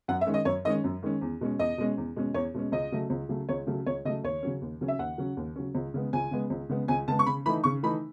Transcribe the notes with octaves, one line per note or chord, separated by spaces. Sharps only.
F#2 F#5
E5
D#3 G#3 C#4
D#5
F#2 C#5
D#3 G#3 C#4 D#5
F#2
D#3 G#3 C#4
E2
B2 G#3 C#4
E2 D#5
B2 G#3 C#4
E2
B2 G#3 C#4
E2 C#5
B2 G#3 C#4
C#2 D#5
C#3 F#3 A3
C#2
C#3 F#3 A3
C#2 C#5
C#3 F#3 A3
C#2 C#5
C#3 F#3 A3 D#5
D#2 C#5
C#3 F#3 C#4
D#2
C#3 F#3 C#4
E5
D#2 F#5
C#3 F#3 C#4
D#2
C#3 F#3 C#4
C#2
C#3 G#3 B3
C#2 G#5
C#3 G#3 B3
C#2
C#3 G#3 B3
C#2 G#5
C#3 G#3 B3 A5
C#6
C#3 B5
E3 A3 D#4 B5
C#3 C#6
E3 A3 D#4 B5